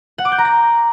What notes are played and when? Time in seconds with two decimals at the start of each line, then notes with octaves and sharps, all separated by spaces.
0.18 F#5
0.25 D6
0.32 G6
0.38 A#5
0.45 A#6